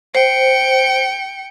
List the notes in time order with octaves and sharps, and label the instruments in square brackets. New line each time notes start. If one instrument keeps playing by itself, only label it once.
[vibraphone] C5 [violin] G5 C#7